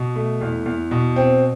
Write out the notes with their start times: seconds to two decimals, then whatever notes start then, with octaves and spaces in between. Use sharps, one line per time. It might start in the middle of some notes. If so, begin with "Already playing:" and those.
Already playing: B2
0.16 A3
0.41 E2
0.66 E2
0.91 B2
1.16 C4